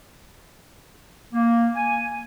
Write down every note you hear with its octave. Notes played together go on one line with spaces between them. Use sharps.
A#3
G#5